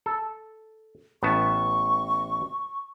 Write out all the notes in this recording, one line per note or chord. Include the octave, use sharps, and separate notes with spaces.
A4
A1 B3 A5 C#6